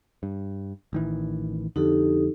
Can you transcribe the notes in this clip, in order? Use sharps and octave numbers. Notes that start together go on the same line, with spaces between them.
G2
A1 D#3 E3
F2 D3 D#4 G4 A4